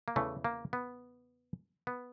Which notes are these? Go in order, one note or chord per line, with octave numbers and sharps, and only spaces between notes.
A#3
E2 C#3 E3 A3
A#3
B3
B3